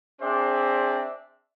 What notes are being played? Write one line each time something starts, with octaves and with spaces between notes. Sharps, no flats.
C4 D4 G#4 C5 D5 E5